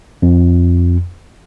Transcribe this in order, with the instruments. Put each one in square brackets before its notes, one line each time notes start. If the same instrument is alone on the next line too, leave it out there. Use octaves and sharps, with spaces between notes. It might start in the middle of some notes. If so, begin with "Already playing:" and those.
[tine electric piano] F2